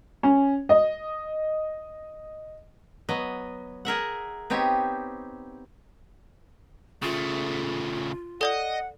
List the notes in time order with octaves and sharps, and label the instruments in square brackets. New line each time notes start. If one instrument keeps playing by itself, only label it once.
[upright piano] C#4
D#5
[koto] F#3 B3 D#5
G#4 A#4 E5 F#5
B3 C4 D#4 G4 C#5
[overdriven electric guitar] C#3 A3 [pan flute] F4
[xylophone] A4 D5 D#6 [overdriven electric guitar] D#5 [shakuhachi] F#5